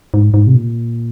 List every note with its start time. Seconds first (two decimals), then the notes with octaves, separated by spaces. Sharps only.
0.14 G#2
0.34 G#2
0.47 C3
0.55 A#2